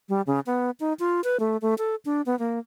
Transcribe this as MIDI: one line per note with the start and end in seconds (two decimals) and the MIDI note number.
0.09 0.22 55
0.27 0.40 49
0.46 0.71 59
0.80 0.93 63
0.99 1.21 65
1.24 1.37 71
1.40 1.57 57
1.62 1.74 57
1.78 1.95 69
2.05 2.22 62
2.26 2.38 59
2.39 2.59 58